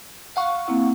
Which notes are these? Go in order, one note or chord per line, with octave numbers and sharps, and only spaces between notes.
F5 F#5 C#6
A#3 C4 E4